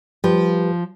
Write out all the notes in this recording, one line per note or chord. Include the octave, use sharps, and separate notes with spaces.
F3 G3 G4 B4